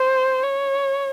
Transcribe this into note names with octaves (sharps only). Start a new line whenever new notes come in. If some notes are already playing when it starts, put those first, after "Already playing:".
Already playing: C5
C#5